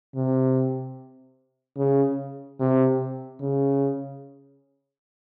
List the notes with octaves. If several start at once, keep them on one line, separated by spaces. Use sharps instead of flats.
C3
C#3
C3
C#3